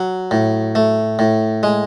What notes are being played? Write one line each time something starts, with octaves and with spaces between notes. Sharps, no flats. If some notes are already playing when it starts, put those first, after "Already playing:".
Already playing: F#3
A2
A3
A2
G#3